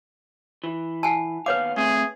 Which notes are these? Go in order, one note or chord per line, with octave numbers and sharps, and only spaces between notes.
E3
F#5 G#5 A5
D#2 B3 B4 C#5 F5 D6
A3 C4 G#4